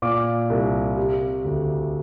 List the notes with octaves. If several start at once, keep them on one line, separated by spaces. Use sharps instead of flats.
A#2 D6
C2
C3
D2